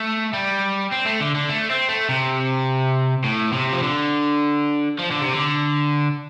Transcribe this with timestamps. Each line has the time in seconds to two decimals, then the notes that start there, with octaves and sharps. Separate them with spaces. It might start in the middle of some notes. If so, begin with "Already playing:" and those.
Already playing: A3
0.33 G3
0.92 C4
1.06 A3
1.21 D3
1.35 D3
1.49 A3
1.70 C4
1.89 A3
2.09 C3
3.24 A2
3.53 C3
3.73 F3
3.83 D3
4.99 F3
5.11 D3
5.22 C3
5.34 D3